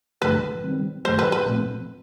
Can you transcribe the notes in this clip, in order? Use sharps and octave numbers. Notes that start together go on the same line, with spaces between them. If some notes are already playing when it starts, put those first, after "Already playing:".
G2 D3 F3 A3 B4
D#3 G3 C4
G2 D#3 F#3 A3 C5
B4
B4
A#2 F3 A3 C4